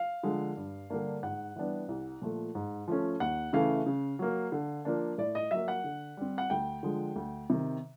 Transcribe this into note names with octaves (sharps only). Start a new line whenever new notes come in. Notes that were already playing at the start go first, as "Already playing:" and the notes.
Already playing: F5
D3 F3 G#3
G2
D3 G3 A#3 D4
G#2 F#5
E3 G3 B3 D4
C2
A#2 F3 A3
G#2
F3 A3 C#4
D#2 F#5
C#3 E3 A3 F5
C#3
F#3 A#3
D3
F3 A#3 D4
A2 D5
D#5
F#3 A#3 E5
F#5
D3
G3 C4
F#5
D2 G5
D3 F3 G#3
D2
C3 D#3